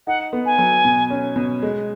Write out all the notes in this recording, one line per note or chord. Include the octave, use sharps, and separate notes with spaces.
D#4 F#5
B3
G#5
F#3
B2
C#4
B2
G#3